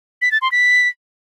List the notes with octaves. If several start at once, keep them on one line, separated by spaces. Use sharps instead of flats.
B6
A6
C6
B6